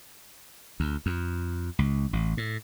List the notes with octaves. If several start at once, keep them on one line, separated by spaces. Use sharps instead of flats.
D2
F2
C#2
A1
A2